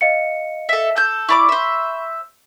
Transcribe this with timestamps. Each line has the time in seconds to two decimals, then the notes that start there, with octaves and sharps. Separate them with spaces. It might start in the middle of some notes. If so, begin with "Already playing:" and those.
0.01 D#5 F5 C#7
0.69 A4 E5
0.96 A4 G6
1.29 E4 D5 B5 C#6 D6
1.49 C5 E5